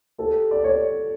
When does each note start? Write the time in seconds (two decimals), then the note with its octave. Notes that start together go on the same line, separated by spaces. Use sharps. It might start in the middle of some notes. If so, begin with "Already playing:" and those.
0.18 G4 A4
0.51 D5
0.64 C#5